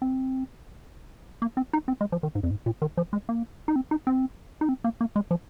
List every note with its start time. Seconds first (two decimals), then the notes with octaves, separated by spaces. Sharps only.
0.02 C4
1.42 A#3
1.57 C4
1.73 D#4
1.88 C4
2.01 G#3
2.12 F3
2.23 D#3
2.35 G#2
2.43 F2
2.51 G#2
2.66 A#2
2.82 D#3
2.97 F3
3.13 G#3
3.29 A#3
3.68 D#4
3.76 C4
3.91 D#4
4.07 C4
4.61 D#4
4.69 C4
4.84 A#3
5.01 A#3
5.16 G#3
5.31 F3